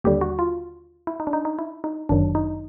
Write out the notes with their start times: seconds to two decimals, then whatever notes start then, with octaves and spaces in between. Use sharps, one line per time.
0.04 D#2 D3 G3 G4
0.21 F#4
0.39 F4
1.07 E4
1.20 D#4
1.27 D4
1.33 D#4
1.45 D#4
1.59 E4
1.84 D#4
2.09 G1 F#2 D#3 F#3 D4
2.35 D#4